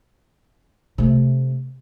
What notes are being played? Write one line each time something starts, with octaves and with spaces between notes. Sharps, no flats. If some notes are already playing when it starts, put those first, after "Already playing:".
C3 A3